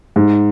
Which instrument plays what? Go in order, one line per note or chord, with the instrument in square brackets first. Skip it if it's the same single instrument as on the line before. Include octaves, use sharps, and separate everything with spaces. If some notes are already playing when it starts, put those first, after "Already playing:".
[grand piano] G#2